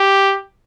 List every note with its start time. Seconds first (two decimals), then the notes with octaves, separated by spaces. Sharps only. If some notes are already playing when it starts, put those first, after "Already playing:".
Already playing: G4